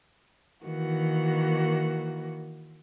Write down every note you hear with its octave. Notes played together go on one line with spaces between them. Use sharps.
D#3 E3 A#3 F#4